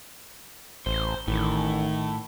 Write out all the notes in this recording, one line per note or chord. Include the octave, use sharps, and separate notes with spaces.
A1 C5
A1 A2 D#3 A3